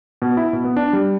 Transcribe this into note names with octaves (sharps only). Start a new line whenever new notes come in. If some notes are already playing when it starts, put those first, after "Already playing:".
B2
E4
B2
B3
D4
G3